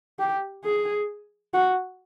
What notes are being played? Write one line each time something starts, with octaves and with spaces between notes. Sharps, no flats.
G4
G#4
F#4